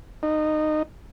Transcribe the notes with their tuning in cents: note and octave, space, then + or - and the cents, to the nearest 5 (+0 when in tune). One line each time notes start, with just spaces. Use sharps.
D#4 -20